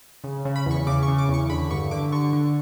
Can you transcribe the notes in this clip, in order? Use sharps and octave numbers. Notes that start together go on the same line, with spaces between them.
C#3
C#3
B5
E2 C#6
C#3 D6
C#6
C#3
D6
E2
C#6
D3 B5
G2 C#6
D3 D6
D3 C#6
D3